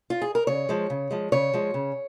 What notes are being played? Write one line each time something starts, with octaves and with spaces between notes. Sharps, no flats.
F4
G#4
A#4
C#3 C#5
F3 G#3
C#3
F3 G#3
C#3 C#5
F3 G#3
C#3